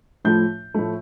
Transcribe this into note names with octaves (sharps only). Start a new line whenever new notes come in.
A2 F3 A3 G6
A2 F3 A3